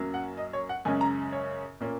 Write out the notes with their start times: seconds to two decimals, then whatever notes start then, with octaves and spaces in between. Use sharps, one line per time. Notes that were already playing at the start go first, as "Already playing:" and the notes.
Already playing: F#2 F#3 A#3 C#4
0.14 F#5
0.37 D#5
0.53 C#5
0.69 F#5
0.85 F#2 C#3 G#3 C#4 G#5
1.01 A#5
1.32 C#5
1.81 A#2 A#3 C#4